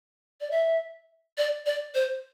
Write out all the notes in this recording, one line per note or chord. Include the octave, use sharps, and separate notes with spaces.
D5
E5
D5
D5
C5